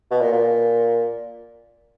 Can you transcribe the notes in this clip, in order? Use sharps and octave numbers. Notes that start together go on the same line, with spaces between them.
B2
A#2
A#2